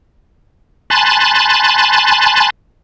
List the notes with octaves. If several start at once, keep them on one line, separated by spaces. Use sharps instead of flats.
G#5 A5 B5 C6 F#6 A6